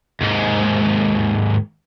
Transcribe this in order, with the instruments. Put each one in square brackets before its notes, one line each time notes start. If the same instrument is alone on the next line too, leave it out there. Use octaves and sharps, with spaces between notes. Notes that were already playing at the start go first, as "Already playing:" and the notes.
[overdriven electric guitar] D#2 G#2